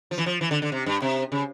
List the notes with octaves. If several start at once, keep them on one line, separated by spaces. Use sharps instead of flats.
F3
E3
F3
E3
D3
D3
C3
G2
C3
C#3